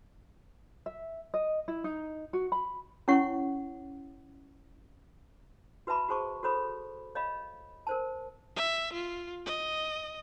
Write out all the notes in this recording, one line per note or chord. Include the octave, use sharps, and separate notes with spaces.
E5
D#5
E4
D#4
F#4
B5
C#4 E4 C#5 F#5 C#6
F#4 B4 E5 A5 B5 D6
F#4 G#4 C5 A5 C#6 D6
F#4 A4 C5 C#5 B5 D#6
C#5 D#5 F5 B5
A#4 C5 A5
E5
F4
D#5